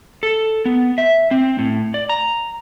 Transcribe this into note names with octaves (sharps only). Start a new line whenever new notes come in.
A4
B3
E5
C4
A2
D5
A#5